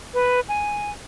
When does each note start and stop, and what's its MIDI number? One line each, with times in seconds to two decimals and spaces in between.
0.14 0.40 71
0.49 0.91 80